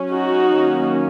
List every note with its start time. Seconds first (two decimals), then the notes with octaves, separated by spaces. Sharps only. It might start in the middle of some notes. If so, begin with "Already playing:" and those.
Already playing: F#3 C#4
0.12 D#4 F#4
0.52 D#3 F#3 A#3 C#4